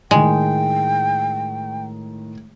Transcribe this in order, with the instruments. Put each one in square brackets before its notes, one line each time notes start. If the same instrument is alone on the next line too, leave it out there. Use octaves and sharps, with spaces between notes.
[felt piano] A2 D#3 [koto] G#3 [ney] G5